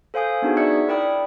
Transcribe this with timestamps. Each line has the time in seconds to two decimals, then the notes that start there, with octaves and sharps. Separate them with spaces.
0.14 A4 C5 F5 G#5 D#6 G6
0.42 B3 D4 D#4 F#4 G#4
0.57 D5 E5 E6 F#6 G#6 C#7
0.88 E4 A#4 D5 G5 B5 D#6